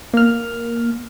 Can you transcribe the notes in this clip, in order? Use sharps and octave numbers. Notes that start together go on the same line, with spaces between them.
A#3 F6